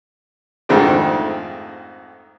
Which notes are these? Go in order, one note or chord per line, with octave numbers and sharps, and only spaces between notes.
F2 G#2 D#3 A3 C4 D4